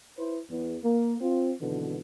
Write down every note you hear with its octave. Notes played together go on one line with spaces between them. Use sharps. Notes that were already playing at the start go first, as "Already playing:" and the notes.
E4 B4 C5
E2
A#3
C4 F4
G#1 B2 D3 E3